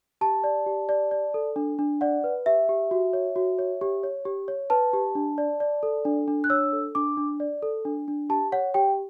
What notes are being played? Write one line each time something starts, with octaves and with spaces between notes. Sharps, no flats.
G4 A5
D5
G4
D5
D5
A4
D4
D4
D5 F#5
B4
G4 E5
G4
F#4
C#5
F#4
C#5
G4
C#5
G4
C#5
B4 A5
G4
D4
D5
D5
A4
D4
D4
F#6
C#5 E6
A4
D4 D6
D4
D5
A4
D4
D4
G4 A5
C#5 F#5
G4 G5